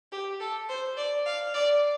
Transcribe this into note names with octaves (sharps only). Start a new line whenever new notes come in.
G4
A4
C5
D5
F5
D5